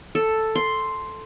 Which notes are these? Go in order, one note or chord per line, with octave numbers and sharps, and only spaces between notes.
A4
C6